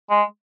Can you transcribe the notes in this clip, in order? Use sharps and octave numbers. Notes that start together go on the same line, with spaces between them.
G#3